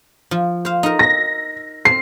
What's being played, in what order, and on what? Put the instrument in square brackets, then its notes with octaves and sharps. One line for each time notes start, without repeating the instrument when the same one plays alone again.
[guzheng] F3
C5 F5
D#4 A#4
[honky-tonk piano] A#6
[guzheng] C4 [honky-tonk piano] C7